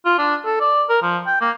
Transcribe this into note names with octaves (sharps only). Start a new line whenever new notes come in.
F4
D4
A4
D5
A#4
F3
G5
A#3